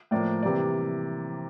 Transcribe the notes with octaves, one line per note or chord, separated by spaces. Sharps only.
A2 F3 A#3 D5
C3 E3 G3 A#3 D5